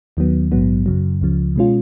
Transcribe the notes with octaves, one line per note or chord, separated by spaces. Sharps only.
D#2 D#3 F#3 B3
A#1 G#2 F#3 B3
F#2 C#3 F#3
C#2 C#3 F3
B2 G#3 C#4 F4